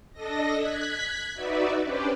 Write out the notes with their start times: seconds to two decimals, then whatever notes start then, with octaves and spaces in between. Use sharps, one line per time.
0.13 D4 A4 D#5 A#6
0.57 F#6 G#6 B6
1.35 D#4 F#4 B4 D5 E5
1.84 C#4 D4 G4 B4 C5 D5